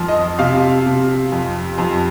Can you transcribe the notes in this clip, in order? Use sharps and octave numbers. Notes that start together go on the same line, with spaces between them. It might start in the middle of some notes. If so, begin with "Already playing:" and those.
Already playing: F2 F3
D#5
C3 F5
C3
F2
F2